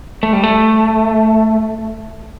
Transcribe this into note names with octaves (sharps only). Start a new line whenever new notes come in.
A3
G3
A3